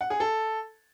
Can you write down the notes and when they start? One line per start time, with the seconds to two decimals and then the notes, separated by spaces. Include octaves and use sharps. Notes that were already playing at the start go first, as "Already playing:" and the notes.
0.01 F#5
0.10 G#4
0.20 A4